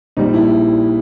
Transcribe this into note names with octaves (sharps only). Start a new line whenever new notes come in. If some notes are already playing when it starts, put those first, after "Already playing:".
A#1 A#2 G3 D#4
E4